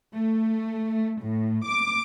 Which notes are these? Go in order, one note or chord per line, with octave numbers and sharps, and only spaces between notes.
A3
A2
D6